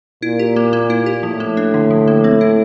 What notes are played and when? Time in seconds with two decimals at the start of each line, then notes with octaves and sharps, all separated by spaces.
0.22 A#2 E4
0.39 G4
0.56 A#3
0.73 A#3
0.90 E4
1.06 G4
1.23 A2 F3
1.40 A#3
1.57 D4
1.74 D3
1.91 F3
2.08 A#3
2.24 C4
2.41 E4